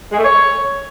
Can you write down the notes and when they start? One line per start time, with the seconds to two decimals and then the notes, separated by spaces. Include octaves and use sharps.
0.12 G#3
0.18 A3
0.24 C#5